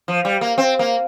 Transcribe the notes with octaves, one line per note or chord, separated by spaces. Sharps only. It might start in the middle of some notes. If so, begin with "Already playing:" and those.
F3
G3
A#3
C4
A#3